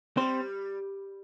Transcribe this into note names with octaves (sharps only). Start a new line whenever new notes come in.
G3 C4 C5